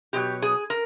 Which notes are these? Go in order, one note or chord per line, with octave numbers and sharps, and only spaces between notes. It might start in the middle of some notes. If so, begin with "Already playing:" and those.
B2 F#3 G4
G#4
A#4